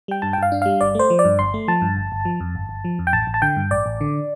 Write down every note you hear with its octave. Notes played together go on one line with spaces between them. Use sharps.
G3 G5
G2 A5
G5
G2 F5
D4
G3 F5
G1 D5
A3 C5
F3
D5
G2
G1 C6
A3
F3 A5
G2
G1
G1
F3
F2
G1
G1
F3
F2
G5
A1 A5
A1
A5
D3 G5
G2
A1 D5
A1
D3